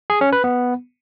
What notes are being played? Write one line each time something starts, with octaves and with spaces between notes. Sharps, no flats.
G#4
C#4
B4
B3